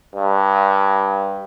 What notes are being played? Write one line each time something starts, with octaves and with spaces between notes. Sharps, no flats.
G2